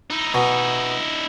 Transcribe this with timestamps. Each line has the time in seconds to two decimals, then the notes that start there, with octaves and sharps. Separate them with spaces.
0.11 D#4 E4
0.34 B2